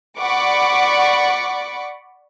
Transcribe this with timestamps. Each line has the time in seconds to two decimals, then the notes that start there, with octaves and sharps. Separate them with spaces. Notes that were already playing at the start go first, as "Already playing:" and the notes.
0.18 D5 F#5 B5 C#6 D6